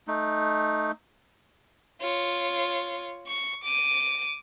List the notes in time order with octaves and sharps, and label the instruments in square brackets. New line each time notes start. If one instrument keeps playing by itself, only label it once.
[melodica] A3 D#4
[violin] F4 C#5
C#6
D6 D#7